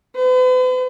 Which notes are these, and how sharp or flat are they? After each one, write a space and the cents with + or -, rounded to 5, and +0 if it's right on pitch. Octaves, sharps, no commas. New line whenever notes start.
B4 +45